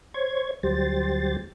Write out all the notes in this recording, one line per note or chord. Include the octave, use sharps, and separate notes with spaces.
C5 C#5 G#6
D2 F#3 G3 G4 C5 A6